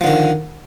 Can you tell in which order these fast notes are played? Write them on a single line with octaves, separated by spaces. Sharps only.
F3 D3 D#3